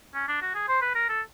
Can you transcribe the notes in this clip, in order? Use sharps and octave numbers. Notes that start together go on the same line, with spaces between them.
C#4
D4
F#4
G#4
C5
B4
A#4
A4